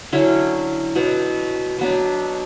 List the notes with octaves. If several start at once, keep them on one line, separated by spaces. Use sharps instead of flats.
D3 F#3 C#4 E4
B2 F#3 B3
B2 F#3 B3 D4